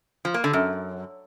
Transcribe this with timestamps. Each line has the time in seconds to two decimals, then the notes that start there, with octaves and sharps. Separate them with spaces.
0.25 F3
0.34 A#3
0.44 D3
0.53 F#2